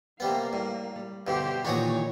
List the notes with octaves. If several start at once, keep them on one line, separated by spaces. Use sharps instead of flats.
C3 G3 A#3 B3 F5
A2 G3
G3
G2 B2 D3 G4 C5
A#2 D#3 E3 D4 F#4 C#5 D#6